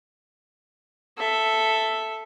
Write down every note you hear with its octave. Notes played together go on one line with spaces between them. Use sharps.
A4 E5